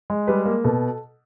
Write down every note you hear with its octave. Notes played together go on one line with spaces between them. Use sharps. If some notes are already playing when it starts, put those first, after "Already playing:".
G#3
G3 B4
A#3
B2 A4